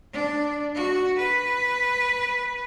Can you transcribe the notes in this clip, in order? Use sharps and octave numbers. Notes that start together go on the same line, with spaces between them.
D4
F#4
B4